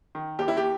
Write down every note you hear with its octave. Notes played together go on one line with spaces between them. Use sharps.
D#3
D#2 G4
E4
G4